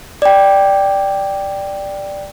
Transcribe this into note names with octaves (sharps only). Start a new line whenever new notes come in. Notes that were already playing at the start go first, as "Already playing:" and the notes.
D5 G5